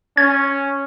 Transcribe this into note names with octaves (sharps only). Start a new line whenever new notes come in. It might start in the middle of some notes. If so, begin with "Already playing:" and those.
C#4 G#6